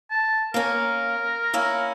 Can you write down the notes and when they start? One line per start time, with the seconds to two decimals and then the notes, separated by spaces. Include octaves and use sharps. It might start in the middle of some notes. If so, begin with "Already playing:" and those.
0.11 A5
0.54 A#3 C#4 A#4
1.53 A#3 C#4 E4